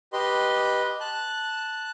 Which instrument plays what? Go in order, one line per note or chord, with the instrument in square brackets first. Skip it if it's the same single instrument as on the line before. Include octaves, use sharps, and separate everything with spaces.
[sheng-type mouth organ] G4 B4 D#5 C6
A5 F#6